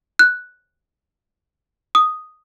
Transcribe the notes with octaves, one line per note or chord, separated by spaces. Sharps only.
F#6
D#6